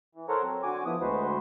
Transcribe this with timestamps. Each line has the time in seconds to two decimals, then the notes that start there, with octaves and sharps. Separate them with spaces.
0.15 E3
0.29 A4 A#4 C5 C#5 F#5 A#5
0.43 F#3 C4
0.63 D3 F#4 G#5 D6
0.86 F3 B3 E4 D#6
1.01 D2 G#3 F#4 B4 C5